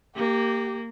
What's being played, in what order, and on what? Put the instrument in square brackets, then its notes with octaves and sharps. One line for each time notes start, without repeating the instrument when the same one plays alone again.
[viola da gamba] A#3 [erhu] G4